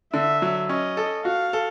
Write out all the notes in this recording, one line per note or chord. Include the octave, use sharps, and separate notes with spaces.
D3 E5
F#3
C#4 D#5
A4
F#4 F5
A4